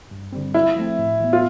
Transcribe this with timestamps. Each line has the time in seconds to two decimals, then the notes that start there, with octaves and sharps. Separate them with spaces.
0.11 G2
0.32 D3 G3 C4
0.54 D3 E4
0.76 F3 A3 C4
0.99 A2
1.20 E3 B3
1.33 F4